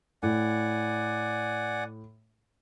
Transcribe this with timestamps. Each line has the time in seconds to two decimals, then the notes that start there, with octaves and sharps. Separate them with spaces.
0.23 A2 D5 F#5 G#5